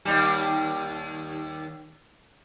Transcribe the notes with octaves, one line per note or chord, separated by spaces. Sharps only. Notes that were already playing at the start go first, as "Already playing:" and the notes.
D#2 G3